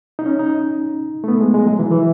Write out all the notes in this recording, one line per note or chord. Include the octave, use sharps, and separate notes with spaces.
D#4
C#4
D#4
A3
B3
G#3
G#3
F#3
E3
E3